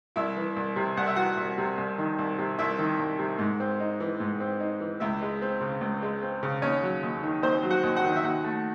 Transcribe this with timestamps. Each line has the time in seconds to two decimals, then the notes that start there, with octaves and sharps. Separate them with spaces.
0.16 C2 E4 E5
0.36 E3
0.56 C2
0.76 C3
0.97 C2 F#5
1.07 E5
1.16 E3 F#4 F#5
1.37 C2
1.58 C3
1.78 C2
1.98 D#3
2.18 C2
2.38 C3
2.59 C2 E4 E5
2.79 D#3
2.99 C2
3.19 C3
3.39 G#2
3.60 C4
3.80 D#4
4.00 E3
4.20 G#2
4.40 C4
4.60 D#4
4.80 E3
5.00 C#2 E4 E5
5.22 G#3
5.42 C4
5.61 C#3
5.81 C#2
6.02 G#3
6.22 C4
6.43 C#3
6.62 D#2 C#4 C#5
6.83 F#3
7.03 D#2
7.23 D#3
7.43 D#2 C4 C5
7.63 F#3
7.70 F#4 F#5
7.83 D#2
7.97 F#4 F#5
8.04 D#3
8.16 E5
8.24 D#2 F#4 F#5
8.44 A3